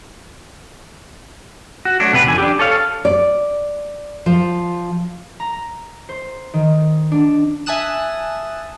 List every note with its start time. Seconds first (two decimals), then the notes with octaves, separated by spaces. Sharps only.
1.85 F#4
2.00 F#3 A3 D4
2.13 C3 B3 B4
2.26 F2 D3 G#5
2.38 D4 G4
2.59 A4 C#5 F5
3.05 D5
4.26 F3
5.40 A#5
6.09 C5
6.54 D#3
7.12 D4
7.66 E5 G#5 A5 D#6 F#6 E7